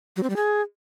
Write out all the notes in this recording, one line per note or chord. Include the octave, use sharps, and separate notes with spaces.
F#3
C4
G3
G#4